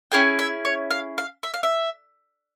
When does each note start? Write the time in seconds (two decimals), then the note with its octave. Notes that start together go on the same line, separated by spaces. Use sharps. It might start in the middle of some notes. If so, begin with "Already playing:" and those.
0.12 C#4 E4 G#4 G5
0.39 E5
0.65 C#5
0.91 F5
1.18 F5
1.43 E5
1.54 F5
1.63 E5